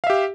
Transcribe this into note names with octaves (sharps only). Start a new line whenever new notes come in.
G4 E5 F5